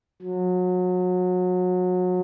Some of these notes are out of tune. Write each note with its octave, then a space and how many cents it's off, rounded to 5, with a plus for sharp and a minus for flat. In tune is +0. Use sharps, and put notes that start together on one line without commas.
F#3 -30